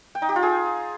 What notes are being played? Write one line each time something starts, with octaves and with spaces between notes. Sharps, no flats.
G5
D#4
G4
F4
G#4